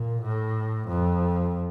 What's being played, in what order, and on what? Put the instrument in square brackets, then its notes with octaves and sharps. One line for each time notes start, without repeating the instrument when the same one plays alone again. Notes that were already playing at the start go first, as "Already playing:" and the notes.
Already playing: [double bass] A#2
A2
F2